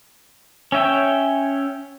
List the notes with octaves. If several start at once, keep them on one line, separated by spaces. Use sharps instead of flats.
C#4 C#5 E5 G5